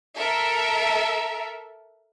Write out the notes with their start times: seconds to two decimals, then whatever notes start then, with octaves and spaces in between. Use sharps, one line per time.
0.17 A4 A#4 E5